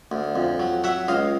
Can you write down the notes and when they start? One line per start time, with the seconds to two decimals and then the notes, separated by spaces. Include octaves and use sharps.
0.12 D2
0.36 F2
0.60 F#3
0.84 F#3 E5 F#5
1.08 C#2 D#5 F5